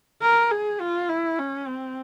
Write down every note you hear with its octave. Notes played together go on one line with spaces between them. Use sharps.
A#4
G#4
F4
E4
C#4
C4